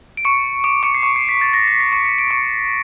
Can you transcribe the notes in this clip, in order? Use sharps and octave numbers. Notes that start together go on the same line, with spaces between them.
D7
C#6 C#7
D6 D7
C#6 C#7
C7
C#6 C#7
C7
B6
A6
A#6
B6
C7
C#6 C#7
C#7
D7
C#6 C#7